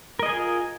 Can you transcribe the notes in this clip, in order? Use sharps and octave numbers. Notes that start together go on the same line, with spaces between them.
F4 G#4 A#4 D#5 G#5